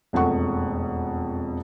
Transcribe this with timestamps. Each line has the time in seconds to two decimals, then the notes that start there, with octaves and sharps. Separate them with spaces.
0.13 E1 F2 A3 F#5 C#6